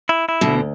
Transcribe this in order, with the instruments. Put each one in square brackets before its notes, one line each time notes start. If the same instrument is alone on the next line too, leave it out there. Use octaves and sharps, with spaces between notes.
[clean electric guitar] E4
E4
[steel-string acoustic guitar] B2 D3
[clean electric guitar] D2